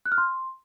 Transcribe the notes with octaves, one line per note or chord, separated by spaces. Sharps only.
F#6
F6
C6